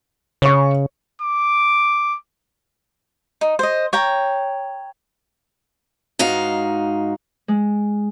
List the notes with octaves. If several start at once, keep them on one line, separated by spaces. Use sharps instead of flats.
C#3 C#5 C#6
D6
D#4
C5 D#5
C#5 G5 A#5
G#2 D#4 F#4 F5
G#3